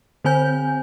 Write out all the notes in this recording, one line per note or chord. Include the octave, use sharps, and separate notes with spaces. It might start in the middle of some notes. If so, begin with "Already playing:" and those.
D3 C4 C5 G#5 G6